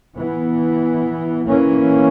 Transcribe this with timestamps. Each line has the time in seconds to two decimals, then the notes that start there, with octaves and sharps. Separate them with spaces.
0.15 E3 B3
1.46 E3 A#3 C#4